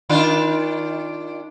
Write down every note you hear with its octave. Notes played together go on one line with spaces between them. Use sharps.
D#3 D4 F4